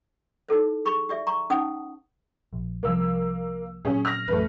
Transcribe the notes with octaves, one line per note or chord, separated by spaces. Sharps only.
D#4 E4 A4 C5
G#4 B5 C#6
G4 D5 E5
A#5 C#6
C#4 D#4 C5 F#5 A5 D#6
A#1
C2 F3 A#3 E6
A#2 F#3 C#4 G#4
F6 A#6
A1 F2 F#3 A3 B4